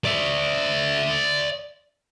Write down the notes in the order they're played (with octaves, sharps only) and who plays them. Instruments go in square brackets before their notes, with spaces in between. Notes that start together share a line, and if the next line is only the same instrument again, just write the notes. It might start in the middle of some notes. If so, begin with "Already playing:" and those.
[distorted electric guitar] D5 E5